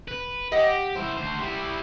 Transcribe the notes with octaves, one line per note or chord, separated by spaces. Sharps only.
B4
G4 D#5 F#5
E4 C5
D2 C5
G3 E4